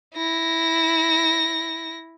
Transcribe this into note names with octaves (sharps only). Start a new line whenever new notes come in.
E4 A#6